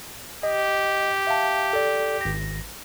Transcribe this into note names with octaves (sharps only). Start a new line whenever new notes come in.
G4 D#5
E5 F5 A5
A4 D5
G#1 A#6